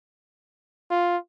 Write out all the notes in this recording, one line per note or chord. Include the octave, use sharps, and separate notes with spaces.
F4